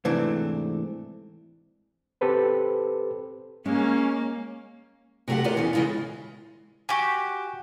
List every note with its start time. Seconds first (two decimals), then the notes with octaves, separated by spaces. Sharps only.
0.05 G#2 C3 E3 A3 C4 D4
2.21 C4 G4 A4 B4 C5
3.66 G#3 A#3 C#4
5.28 C3 F#3 A3 G4 F#5
5.44 F4 G4 A#4 C5 C#5
5.56 E2 E3 B3 C#4
5.73 C#3 E3 G#3 E4 F4
6.89 F#4 G4 G#5 C#6